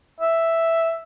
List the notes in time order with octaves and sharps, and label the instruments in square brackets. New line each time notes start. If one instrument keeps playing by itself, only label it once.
[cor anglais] E5